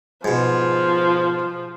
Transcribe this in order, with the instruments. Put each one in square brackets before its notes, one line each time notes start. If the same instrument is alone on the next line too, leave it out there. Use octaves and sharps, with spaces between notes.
[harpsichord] G#2 B2 [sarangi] F3